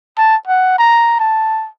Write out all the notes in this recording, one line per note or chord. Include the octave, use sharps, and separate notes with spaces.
A5
F#5
A#5
A5